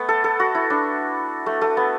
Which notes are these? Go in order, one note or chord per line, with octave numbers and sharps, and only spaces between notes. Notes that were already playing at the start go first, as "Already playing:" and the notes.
Already playing: A3 B3
A4
A4
F#4
E4
D4
A3
A3
B3